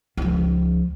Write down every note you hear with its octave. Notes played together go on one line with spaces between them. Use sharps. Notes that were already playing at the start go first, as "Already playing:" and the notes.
C#2 F3